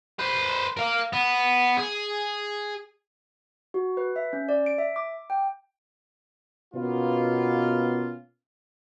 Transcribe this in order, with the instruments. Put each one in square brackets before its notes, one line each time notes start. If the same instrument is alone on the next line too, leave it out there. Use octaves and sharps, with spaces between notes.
[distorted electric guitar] B4 C5
A#4 F5
B3
G#4
[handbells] F#4
B4
E5
C#4
D5
D7
E5
D6
G5
[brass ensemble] B2 A#3 B3 C#4 F4